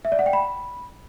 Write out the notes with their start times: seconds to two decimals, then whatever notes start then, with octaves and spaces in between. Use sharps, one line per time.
0.05 E5
0.12 D5
0.19 F#5
0.26 G5
0.33 B5